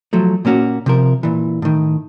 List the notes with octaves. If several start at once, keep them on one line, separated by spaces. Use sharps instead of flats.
F3 F#3 A3
A#2 A#3 C#4 F#4
C3 F3 A#4
A#2 E3
A2 D#3